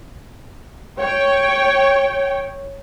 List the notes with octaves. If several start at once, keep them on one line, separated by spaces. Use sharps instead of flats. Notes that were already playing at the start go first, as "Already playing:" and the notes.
C#5 G5